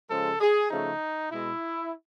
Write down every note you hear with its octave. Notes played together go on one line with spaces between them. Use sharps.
C#3 F3 G#3 A4
G#4
C#3 F3 A3 D#4
B2 G#3 E4